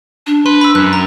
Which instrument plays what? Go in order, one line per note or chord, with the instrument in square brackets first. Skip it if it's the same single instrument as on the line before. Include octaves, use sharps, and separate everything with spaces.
[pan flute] D4
[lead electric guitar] B4 [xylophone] C6
[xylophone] B5 E6
[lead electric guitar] F#2 [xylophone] F#6
[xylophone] A#5